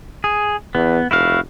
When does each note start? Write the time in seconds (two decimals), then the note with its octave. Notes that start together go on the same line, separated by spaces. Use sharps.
0.24 G#4
0.75 E2 B3
1.11 F1 E4 F#4 F5